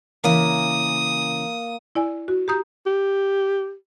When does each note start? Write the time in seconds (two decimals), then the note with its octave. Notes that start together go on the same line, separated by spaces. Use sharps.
0.24 C#3 E3 A#3 G#5 D#6
1.95 E4 D5 G#5
2.28 F#4
2.48 G4 A#5 D#6 G6
2.86 G4